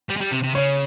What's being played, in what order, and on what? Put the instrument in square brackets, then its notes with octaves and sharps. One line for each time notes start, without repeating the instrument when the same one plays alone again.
[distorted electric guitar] G3
G#3
G3
C3
C3
[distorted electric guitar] C#3 [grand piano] C#5